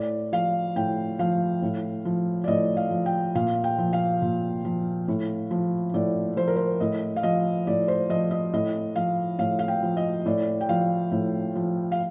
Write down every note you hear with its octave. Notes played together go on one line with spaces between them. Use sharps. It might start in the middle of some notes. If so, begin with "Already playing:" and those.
Already playing: A2 D5
F3 F5
A2 G5
F3 F5
A2
F3
D5
A2 D#5
F5
F3
G5
A#2 F5
G5
F3
F5
A#2
F3
A2
F3
A2 D5
F3 C5
A#4
C5
A2 D#5
F5
F3 D#5
A2 D5
C5
F3 D#5
D#5
A2 D#5
F3 F5
A2 F5
F5
G5
F3
D#5
A2 D5
G5
F3 F5
A2
F3
F5